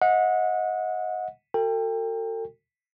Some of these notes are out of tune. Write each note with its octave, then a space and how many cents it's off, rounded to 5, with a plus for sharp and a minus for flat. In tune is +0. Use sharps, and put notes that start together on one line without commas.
D#5 +25 F#5 -25
F#4 +0 A4 +40 G5 +20